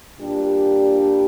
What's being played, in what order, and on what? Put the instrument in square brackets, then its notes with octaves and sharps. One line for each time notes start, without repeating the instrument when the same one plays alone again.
[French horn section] A#2 G3 D4 G4